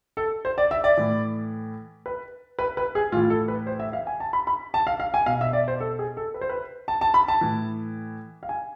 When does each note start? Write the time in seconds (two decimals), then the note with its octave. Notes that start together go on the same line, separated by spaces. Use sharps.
0.17 A4
0.45 C5
0.58 D5
0.71 E5
0.84 D5
0.97 A2 E3
2.06 B4
2.59 B4
2.77 B4
2.95 G#4
3.12 A2 F4
3.16 E3
3.30 A4
3.48 B4
3.67 C5
3.80 E5
3.93 F5
4.07 G#5
4.20 A5
4.33 B5
4.47 B5
4.74 A5
4.87 F5
5.00 F5
5.14 G#5
5.26 B2 F5
5.41 E5
5.53 D5
5.68 C5
5.80 A4
5.99 G#4
6.17 A4
6.34 B4
6.41 C5
6.49 B4
6.88 A5
7.01 A5
7.14 B5
7.28 A5
7.41 A2 E3
8.43 F5
8.49 G#5